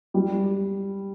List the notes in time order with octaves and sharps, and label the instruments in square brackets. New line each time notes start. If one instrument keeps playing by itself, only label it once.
[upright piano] G3